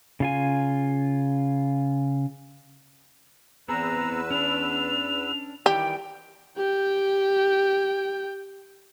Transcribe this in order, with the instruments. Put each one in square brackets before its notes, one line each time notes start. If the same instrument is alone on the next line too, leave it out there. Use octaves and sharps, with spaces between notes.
[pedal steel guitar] C#3 F4 G#5
[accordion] E2 B4 E6 [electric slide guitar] B3 C4 G#4 [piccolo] A#5
[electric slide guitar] C#4 D4 [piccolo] F7
[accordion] D#3 E3 G3 [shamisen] G4 [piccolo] G5
[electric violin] G4 G5